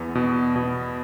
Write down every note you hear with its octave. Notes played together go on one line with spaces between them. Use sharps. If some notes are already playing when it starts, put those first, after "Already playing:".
Already playing: E2 B3
B2
B2